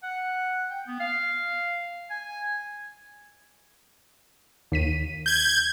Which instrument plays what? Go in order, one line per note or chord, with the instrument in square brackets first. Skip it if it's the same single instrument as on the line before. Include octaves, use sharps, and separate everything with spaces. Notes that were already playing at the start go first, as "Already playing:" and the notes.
[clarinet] F#5
G5
B3
F5
G#5
[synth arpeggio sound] D#2 B6 D#7
[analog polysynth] G6 G#6